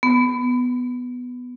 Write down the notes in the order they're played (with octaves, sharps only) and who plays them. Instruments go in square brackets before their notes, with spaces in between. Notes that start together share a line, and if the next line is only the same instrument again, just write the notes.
[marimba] B3